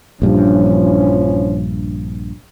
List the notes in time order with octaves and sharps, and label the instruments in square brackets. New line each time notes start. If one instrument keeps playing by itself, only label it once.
[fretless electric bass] A#1 G2 [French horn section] E3 F3 C#4